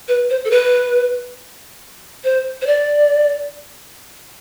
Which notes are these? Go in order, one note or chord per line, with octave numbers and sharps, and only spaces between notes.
B4
C5
A4
B4
C5
C5
D5